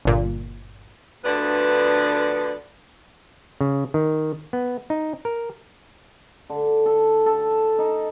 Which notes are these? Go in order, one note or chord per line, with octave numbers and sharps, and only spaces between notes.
G1 A#2
D2 D3 F3 B3 B4 D5
C#3
D#3
B3
D#4
A#4
D3
A4
A4
D#4